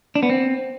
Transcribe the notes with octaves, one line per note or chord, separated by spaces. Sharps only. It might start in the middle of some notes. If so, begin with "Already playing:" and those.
D4
B3
C4